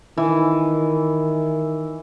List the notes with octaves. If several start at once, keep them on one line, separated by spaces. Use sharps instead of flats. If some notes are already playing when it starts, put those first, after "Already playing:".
D#3 E3